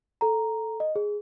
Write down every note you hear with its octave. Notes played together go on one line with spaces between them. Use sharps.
A4 A#5
D#5
G#4